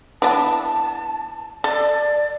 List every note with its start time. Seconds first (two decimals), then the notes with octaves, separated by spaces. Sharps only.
0.22 E3 B3 D4 A5
1.64 A4 D5